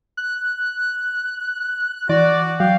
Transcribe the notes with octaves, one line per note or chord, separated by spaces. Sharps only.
F#6
E3 F#4 D5
F#3 F5 G5